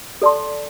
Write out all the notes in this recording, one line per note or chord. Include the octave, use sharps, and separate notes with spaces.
A4 D5 A5 C6